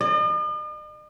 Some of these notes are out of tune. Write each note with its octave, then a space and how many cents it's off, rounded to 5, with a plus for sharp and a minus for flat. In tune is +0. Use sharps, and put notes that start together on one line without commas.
D#5 -45